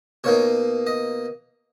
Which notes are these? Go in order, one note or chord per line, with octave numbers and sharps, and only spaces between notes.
B2 A#3 D#4 C#5
D#5